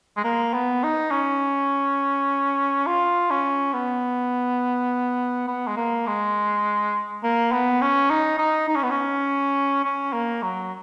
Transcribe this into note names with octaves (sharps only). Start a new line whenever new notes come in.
G#3
A#3
B3
D#4
C#4
F4
C#4
B3
B3
G#3
A#3
G#3
A#3
B3
C#4
D#4
D#4
D#4
C#4
B3
C#4
C#4
A#3
F#3